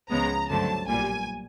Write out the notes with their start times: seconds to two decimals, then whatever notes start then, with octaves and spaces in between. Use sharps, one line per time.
0.11 C#2 C#3 F3 G#3 B3 A#5
0.49 G2 D3 F#3 A3 C4 A5
0.89 B1 A#2 G3 G#5